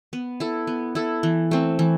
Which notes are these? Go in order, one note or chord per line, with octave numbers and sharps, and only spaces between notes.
B3
E4 A4
B3
E4 A4
E3
A3 C4
E3